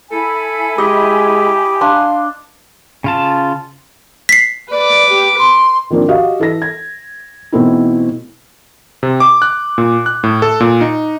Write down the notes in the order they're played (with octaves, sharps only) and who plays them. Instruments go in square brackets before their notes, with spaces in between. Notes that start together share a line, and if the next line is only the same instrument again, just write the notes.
[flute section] E4 G#5 B5 [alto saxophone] A4
[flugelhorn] G#3 [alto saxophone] G4 [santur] D#5
[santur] D4 C6 [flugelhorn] F5
[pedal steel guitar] C#3 F4 A5
[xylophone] B6 C7
[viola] B4 D6 [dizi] D5
[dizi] G4
C6
[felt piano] D#3 F3 A#3 C4 D4
F#4 G4 D#5 F5
E3 A4 B4 A#6
G#6
B2 E3 A3 C4 D#4 E4
[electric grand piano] C3
D6
F#6
A#2
F#6
A2
A4
A#2
D#4